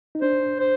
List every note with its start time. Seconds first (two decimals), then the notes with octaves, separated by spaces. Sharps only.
0.15 D#4
0.22 D4 C5
0.59 C5